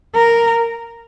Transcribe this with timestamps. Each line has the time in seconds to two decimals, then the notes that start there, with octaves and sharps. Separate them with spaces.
0.15 A#4